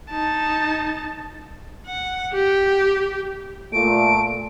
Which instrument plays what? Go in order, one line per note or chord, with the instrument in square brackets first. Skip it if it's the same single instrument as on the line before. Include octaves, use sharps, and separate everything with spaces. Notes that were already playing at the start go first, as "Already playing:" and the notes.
[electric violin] D#4 A5
[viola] F#5
G4
[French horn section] A#2 A3 [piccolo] D7